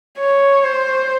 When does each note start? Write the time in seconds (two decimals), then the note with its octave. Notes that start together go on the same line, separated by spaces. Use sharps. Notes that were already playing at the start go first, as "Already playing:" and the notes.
0.18 C#5
0.64 C5